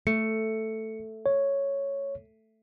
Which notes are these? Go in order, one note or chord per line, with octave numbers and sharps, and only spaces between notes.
A3 C#7
C#5